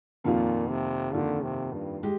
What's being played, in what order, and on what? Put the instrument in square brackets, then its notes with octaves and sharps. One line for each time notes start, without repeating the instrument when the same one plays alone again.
[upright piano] F2 D#3 A#3 F4 [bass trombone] A#2
[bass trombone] C3
[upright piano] F2 D#3 A#3 F4 [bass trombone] D3
[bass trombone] C3
G2
[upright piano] G#3 G4